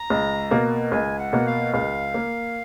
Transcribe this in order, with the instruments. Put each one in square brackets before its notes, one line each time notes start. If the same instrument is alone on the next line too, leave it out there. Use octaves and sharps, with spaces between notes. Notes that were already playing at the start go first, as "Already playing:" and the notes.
Already playing: [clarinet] A#5
[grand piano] C#2
B2 A#3
[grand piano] C#2 [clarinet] G#5
[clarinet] F#5
[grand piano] B2 A#3
[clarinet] F5
[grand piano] C#2 [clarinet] F5
[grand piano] A#3